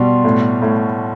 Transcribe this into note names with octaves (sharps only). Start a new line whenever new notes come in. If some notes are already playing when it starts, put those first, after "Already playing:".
Already playing: B2 G3 C6
A2
A2